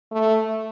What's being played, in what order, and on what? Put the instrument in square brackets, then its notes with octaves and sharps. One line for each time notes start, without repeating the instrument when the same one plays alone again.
[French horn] A3